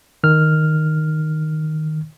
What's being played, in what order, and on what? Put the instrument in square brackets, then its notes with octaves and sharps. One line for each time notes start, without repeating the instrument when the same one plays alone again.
[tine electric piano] D#3 F6